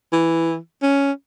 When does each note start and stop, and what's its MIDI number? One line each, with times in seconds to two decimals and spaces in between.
0.13 0.57 52
0.83 1.12 61